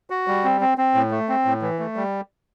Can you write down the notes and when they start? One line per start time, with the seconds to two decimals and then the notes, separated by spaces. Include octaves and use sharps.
0.10 F#4
0.27 G3
0.44 C4
0.61 C4
0.78 C4
0.94 A2
1.11 A3
1.29 C4
1.45 A2
1.62 E3
1.79 A3
1.96 G3